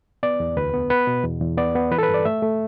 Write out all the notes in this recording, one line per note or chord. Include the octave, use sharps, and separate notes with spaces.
B3 D5
E2
D2 B4
B3
B3 B4
B2
E2
E2
B3 D5
B3
E3 B4
A4
B4
G2
D5
A3 E5
A3